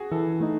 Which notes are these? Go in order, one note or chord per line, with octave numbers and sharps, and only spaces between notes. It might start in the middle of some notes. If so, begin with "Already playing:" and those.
Already playing: F#4 G#4
E3 A4
A3 D#4